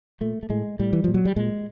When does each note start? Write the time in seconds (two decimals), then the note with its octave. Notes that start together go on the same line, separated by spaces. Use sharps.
0.21 A#2 A3
0.43 A3
0.49 A2 G#3
0.79 A2 G3
0.93 E3
1.04 A#2 F3
1.14 F#3
1.25 G3
1.36 A#2 G#3